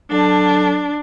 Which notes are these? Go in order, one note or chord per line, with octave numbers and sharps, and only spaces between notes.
F#3 D4 A4 A5